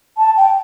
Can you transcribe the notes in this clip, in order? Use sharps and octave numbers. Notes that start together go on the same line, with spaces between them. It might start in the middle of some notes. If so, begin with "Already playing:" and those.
A5
G5